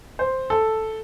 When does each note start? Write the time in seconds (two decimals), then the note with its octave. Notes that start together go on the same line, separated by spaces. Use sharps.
0.19 C5
0.50 A4